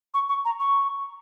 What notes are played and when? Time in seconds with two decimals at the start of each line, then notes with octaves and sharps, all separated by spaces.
0.14 C#6
0.29 C#6
0.45 A#5
0.60 C#6